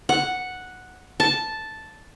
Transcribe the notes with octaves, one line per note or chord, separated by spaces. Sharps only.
F#5
A5